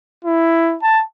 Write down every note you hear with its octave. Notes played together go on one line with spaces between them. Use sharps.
E4
A5